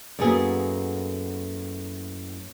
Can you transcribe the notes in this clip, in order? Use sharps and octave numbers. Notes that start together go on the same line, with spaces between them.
F#2 A2 A#3 B3 G#4